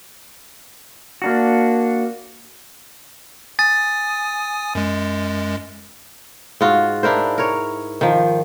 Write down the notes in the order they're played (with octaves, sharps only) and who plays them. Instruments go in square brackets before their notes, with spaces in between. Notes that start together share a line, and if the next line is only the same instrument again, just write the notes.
[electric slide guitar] A#3 D4 F#4
[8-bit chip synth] G#5 D#6 [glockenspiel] A6
[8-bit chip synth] F#2 G#3
[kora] G#2 F4 F#4
D4 E4 A#4 C5
A#4 C#5
D#3 F3